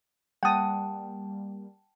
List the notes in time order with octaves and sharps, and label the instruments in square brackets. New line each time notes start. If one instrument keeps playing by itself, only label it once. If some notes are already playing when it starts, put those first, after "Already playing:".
[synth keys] G3 A#3 [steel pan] F#5 D#6 [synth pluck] G5 A5